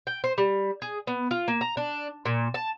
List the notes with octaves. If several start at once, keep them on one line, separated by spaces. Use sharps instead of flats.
G5
C5
G3
G#4
B3
F4
A#3
A#5
D4
A#2
A5